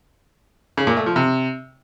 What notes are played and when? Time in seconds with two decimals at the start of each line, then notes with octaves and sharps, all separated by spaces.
0.77 C#3
0.87 A#2
0.97 A3
1.06 F3
1.16 C3